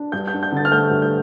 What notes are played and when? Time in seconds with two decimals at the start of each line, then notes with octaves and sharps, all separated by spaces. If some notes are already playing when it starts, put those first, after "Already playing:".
Already playing: D4
0.12 G2 G6
0.28 G6
0.33 D4
0.43 G6
0.52 D3 A6
0.65 F6
0.71 A3 G6
0.91 G2
1.02 G6